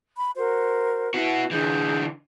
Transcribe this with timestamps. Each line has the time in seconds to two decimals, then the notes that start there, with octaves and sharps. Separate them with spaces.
0.18 B5
0.36 F#4 A#4 C5
1.14 B3 E4 F#4
1.51 D3 E3 G#4 G6